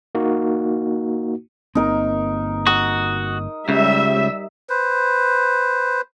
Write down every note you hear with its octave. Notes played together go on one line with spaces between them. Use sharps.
A#3 D#4 F#4
G1 A#3 C4 D#4 A#4
F#4 D#6
C#2 C#3 G3 E5
B4 C5